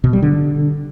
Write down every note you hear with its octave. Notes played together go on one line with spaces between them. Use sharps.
B2
G3
D3